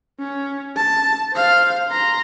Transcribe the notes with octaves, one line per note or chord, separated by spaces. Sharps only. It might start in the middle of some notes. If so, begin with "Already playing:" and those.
C#4
A5
C5 F5
A#5 C6